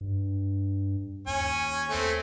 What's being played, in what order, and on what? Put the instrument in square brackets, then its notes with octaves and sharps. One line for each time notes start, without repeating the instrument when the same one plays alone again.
[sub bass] G2
[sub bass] D#2 [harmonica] C#4 G#5
[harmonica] A3 C4